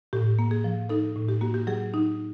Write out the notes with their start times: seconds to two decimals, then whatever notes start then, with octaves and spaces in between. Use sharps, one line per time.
0.13 A2 G4
0.39 A#3
0.51 G#4
0.64 F3
0.89 D#4 A4
1.16 A2
1.29 G4
1.41 A#3 F#4
1.54 G4
1.67 F#3 G#4
1.94 D#4